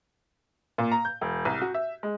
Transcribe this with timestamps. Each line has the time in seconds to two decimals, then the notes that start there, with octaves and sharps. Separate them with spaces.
0.78 A#2
0.92 A#5
1.05 G6
1.21 E1
1.45 C2
1.62 F#4
1.74 E5
2.03 G#3